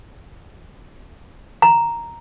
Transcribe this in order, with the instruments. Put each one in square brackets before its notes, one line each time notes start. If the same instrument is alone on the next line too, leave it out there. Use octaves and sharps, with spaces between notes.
[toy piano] A#5